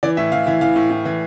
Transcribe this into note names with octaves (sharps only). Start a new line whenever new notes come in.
E3 D5
A2 E5
E3 F5
E3 E5
E3 F5
A2
A2
E3